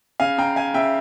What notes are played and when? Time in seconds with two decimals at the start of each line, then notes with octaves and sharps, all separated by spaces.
0.20 C#3 F5 G#5
0.38 C#3 G5 A#5
0.56 C#3 F5 G#5
0.74 C#3 E5 G5